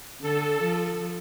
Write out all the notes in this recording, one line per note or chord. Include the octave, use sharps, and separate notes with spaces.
D3 A4
F3